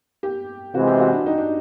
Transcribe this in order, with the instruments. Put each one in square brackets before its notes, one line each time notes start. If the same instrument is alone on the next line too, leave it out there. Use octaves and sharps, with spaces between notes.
[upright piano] G4
[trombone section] C3 E3 G#3 [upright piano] F#4
[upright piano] G4
F#4
D4
D#4
D4